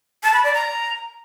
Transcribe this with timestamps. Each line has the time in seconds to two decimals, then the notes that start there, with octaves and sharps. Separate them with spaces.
0.23 A5
0.33 B5
0.44 D5
0.54 A#5